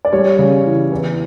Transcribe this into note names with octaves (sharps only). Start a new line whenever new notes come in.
D5
G3 C#5
C#3
E3
E2